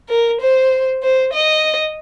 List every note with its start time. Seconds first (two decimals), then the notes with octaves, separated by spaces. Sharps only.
0.09 A#4
0.41 C5
1.03 C5
1.33 D#5